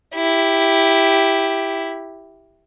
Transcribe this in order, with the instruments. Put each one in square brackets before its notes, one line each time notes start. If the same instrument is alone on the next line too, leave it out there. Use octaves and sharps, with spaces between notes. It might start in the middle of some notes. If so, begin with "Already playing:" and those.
[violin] E4 G4